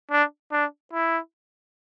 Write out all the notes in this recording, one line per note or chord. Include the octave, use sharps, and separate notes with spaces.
D4
D4
E4